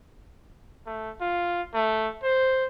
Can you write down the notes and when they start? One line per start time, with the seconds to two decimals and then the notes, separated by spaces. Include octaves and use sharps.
0.86 A3
1.21 F4
1.74 A3
2.23 C5